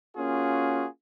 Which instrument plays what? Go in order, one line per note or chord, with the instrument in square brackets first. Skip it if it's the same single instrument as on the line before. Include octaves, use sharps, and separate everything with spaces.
[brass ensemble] A#3 C#4 F4 F#4 G#4